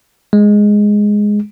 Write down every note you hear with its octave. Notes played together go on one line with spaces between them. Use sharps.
G#3